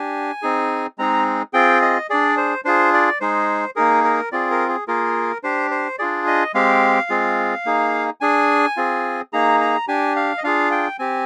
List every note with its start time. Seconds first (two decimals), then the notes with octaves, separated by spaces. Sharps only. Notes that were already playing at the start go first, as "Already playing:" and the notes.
Already playing: D4 G4 G#5
0.42 C4 D#4 G#4
0.98 G#3 C4 D#4 G#4 A#5
1.53 C4 F4 G#4 G5
1.82 D#5
2.10 D4 G#4 D5
2.37 C5
2.64 D4 F4 G#4 C5
2.93 D5
3.20 G#3 D#4 G#4 C5
3.76 A#3 D#4 G#4 A#4
4.04 A#4
4.32 C4 F4 G#4 D5
4.51 A#4
4.69 G#4
4.88 A#3 F4 G#4 A#4
5.43 D4 G4 C5
5.71 C5
5.99 D4 F4 G#4 D5
6.27 D#5
6.54 G#3 C4 G4 F5
7.10 G#3 C4 F4 G#4
7.65 A#3 D#4 G#4
8.21 D4 G#4 G#5
8.77 C4 F4 G#4
9.33 A#3 D#4 G#4 A#5
9.60 A#5
9.88 D4 G4 G#5
10.16 F5
10.38 D#5
10.44 D4 F4 G#4 F5
10.72 G5
10.99 C4 G4 G#5